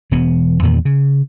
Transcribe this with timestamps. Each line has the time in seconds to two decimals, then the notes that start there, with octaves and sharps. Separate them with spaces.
0.11 E1 E3 B3
0.63 E2 G2 A#2 D#3
0.85 C#3